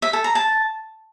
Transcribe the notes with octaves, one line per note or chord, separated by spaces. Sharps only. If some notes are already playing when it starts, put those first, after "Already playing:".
E5
A4
A#5
A5